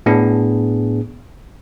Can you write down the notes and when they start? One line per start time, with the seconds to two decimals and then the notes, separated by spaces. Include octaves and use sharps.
0.06 A2 B3 D4 G#4